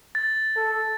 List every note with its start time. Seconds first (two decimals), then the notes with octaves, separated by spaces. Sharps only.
0.15 A6
0.56 A4